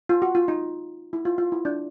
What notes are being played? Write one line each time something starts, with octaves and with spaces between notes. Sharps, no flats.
F4
F#4
F4
D#4
E4
F4
F4
E4
D4